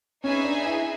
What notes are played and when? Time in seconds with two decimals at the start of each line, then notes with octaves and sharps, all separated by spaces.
0.24 C#4 D#4 G#4 B4 E5 G#5
0.44 D4
0.66 E4